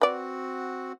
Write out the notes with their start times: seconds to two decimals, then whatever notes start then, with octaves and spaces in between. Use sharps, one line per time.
0.01 C4 F#4 B4 D5 F#5